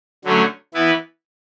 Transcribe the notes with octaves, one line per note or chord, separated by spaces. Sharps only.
D3 F#3 A3 C#4
E3 B3 E4 B4